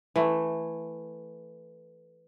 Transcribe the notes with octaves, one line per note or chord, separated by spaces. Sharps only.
E3 A3